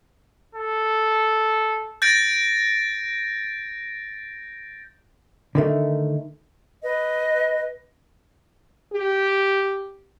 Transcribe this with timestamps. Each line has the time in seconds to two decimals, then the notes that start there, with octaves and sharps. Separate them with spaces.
0.55 A4
2.02 G6 A6 A#6 D7
5.55 D3 D#3 A3
6.81 B4 D#5
8.93 G4